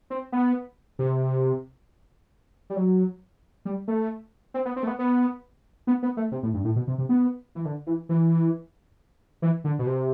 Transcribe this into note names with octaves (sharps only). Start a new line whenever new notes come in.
C4
B3
C3
G3
F#3
G3
A3
C4
B3
C4
A3
B3
B3
B3
B3
A3
C3
A2
G2
A2
B2
C3
C3
B3
E3
D3
E3
E3
E3
D3
B2
C3